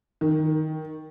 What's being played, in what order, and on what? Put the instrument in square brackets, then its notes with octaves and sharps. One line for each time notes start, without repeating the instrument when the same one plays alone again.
[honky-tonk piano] D#3